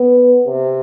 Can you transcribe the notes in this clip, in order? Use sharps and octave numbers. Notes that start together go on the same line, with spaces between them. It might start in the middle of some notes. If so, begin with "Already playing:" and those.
Already playing: B3
C3